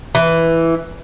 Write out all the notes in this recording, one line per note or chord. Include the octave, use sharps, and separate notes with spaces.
E3